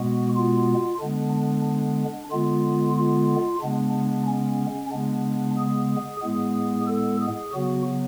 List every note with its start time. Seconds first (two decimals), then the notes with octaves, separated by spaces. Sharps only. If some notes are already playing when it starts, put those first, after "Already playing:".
Already playing: B2 G#3 B3 F#4
0.35 F4
1.00 D3 G#3 B3 D4
1.33 D4
1.66 D4
2.31 D3 G#3 B3 F4
2.97 F4
3.61 C#3 G#3 B3 D4
3.94 D4
4.27 C#4
4.92 C#3 G#3 B3 D4
5.57 G#4
6.22 A2 G#3 B3 G#4
6.87 A4
7.21 G#4
7.53 C#3 F#3 B3 F#4